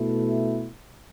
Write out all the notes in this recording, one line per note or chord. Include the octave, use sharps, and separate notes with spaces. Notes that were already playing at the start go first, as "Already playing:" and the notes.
Already playing: B2 A3 E4